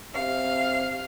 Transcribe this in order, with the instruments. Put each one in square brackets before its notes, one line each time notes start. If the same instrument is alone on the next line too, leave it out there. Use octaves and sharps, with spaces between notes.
[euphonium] C3 [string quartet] F5